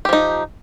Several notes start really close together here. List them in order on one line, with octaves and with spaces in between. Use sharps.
G4 F3 D#4